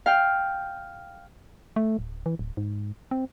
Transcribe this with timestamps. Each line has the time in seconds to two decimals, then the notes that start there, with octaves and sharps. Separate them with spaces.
0.06 F5 G5
1.76 A3
1.99 D1
2.26 E3
2.39 D1
2.57 G#2
3.11 C4